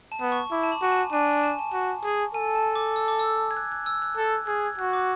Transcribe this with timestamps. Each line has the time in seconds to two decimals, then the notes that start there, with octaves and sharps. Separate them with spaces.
0.12 A5
0.21 B3
0.32 C#6
0.51 E4 D6
0.63 A5
0.72 B5
0.82 F#4 G#5
0.92 A5
1.12 D4 G#5
1.28 G#5
1.43 A5
1.59 A5
1.73 F#4
2.04 G#4
2.34 A4 G#5
2.55 A5
2.76 D6
2.96 E6
3.08 D6
3.19 E6
3.51 G#6
3.57 F#6
3.72 F#6
3.86 E6
4.02 F#6
4.17 A4 F#6
4.47 G#4 G#6
4.78 F#4 F#6
4.93 D6